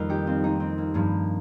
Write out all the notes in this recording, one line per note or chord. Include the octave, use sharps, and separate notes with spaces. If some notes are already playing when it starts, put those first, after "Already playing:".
Already playing: F2 D#3 G3 A#3 C4 F4 A#4
D#4 G4
C4 F4
A#3 D#4
C4
A#3
G2 F3 A#3